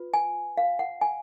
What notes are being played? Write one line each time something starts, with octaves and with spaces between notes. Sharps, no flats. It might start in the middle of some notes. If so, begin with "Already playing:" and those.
Already playing: F4 B4
G#5
F5
F#5
G#5